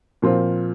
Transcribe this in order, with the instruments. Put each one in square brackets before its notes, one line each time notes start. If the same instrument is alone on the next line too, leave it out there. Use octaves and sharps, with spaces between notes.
[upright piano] A#2 F3 C4 F4